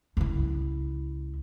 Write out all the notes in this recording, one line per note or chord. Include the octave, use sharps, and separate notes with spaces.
C#2 E4